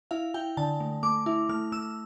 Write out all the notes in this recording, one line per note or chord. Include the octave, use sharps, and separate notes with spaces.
E4 F5
E4 G5
D3 A5
A3
A3 D6
E4
A3 F6
A3 E6